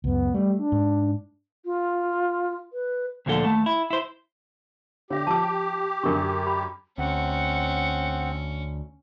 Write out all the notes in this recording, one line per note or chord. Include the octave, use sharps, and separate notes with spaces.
C#2 F#2 B3
G3 A3
D4
G#2
F4
B4
D2 A#2 F3 D4 A4 F#5
D#2 A3 A5
E4
E4 C5
D3 G4 C#5 E5
F3 A5 D6
F#2 D3 D4 A#4 C#6
B5
D2 C4 C#4 F#5